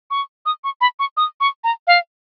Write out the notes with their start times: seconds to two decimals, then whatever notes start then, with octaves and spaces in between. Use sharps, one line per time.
0.11 C#6
0.46 D#6
0.64 C#6
0.81 B5
0.99 C#6
1.17 D#6
1.41 C#6
1.64 A#5
1.87 F5